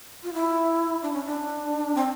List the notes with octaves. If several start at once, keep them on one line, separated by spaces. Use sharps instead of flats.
F4
E4
D4
C#4
D4
C4